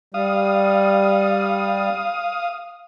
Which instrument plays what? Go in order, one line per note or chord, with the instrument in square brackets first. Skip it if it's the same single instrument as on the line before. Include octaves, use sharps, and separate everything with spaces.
[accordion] G3 [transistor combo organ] F5 D#6